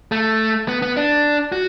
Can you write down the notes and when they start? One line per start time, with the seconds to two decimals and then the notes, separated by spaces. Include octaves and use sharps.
0.12 A3
0.68 B3
0.82 B3
0.97 D4
1.52 F#4